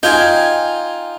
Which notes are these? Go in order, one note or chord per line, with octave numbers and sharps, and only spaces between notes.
D#4 F4 G5 G#5